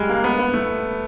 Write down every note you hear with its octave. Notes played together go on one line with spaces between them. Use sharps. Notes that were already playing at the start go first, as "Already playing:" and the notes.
Already playing: G3 G#3
A#3
B3
B3
A3